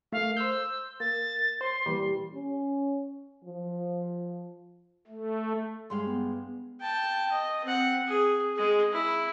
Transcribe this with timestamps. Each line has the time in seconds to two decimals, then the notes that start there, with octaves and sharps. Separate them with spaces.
0.12 A3 A#3 F5
0.37 C5 E6 G6
1.00 A#3 A6
1.61 C5 C6
1.86 A#2 E3 G3
2.34 C#4
3.44 F3
5.07 A3
5.90 G2 G#3 F5 C6
6.07 B3
6.81 G5 A5
7.31 D#5
7.64 C4 F#5
8.07 G#4
8.55 G#3 G#4
8.92 E4